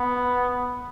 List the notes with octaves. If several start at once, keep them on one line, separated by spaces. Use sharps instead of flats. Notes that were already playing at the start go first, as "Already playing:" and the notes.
Already playing: B3